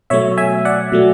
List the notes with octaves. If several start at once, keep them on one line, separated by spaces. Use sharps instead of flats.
B2 F#3 A3 C#5 E5
E5 G#5
D5 F#5
B2 F#3 A3